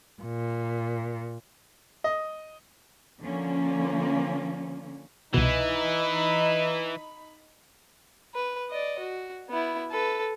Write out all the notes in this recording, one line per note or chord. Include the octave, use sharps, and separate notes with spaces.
A#2
D#5
D3 F3 A#3 C#4
C2 B2 E3 D#4 B5
B4
D5 D#5
F#4
B3 E4
A4 B4